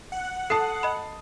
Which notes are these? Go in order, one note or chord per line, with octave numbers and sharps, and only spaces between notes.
F#5
A4 A5 D#6 C7
D#5 B5